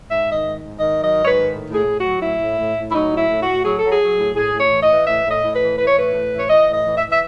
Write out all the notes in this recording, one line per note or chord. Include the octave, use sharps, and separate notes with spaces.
G#2 E5
D#3
D#5
G#2
G#2
D#3 D#5
F#3
D#5
G#2
C#5
B4
D#3
A2
A2
G#4
A2
F#3 F#4
A2 E4
A2
A2
A2
E4
F#3 D#4
A2
E4
A2
A2 F#4
F#3 G#4
F#3 A4
G#4
F#3
A2
A2 G#4
A2
C#5
E3
D#5
E3
A2 E5
A2
D#5
A2
B4
E3
E3 B4
C#5
A2 B4
A2
E3
C#5
E3 D#5
A2
D#5
E3
E5
E3
E5